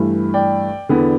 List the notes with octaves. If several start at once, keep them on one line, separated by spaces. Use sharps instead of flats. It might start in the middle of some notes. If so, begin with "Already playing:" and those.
Already playing: G2 E3 A3
D5 G5
E2 D3 B3